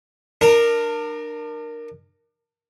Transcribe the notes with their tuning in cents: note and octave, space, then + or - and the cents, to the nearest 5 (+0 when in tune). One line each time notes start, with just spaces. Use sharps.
D4 +35 A#4 +0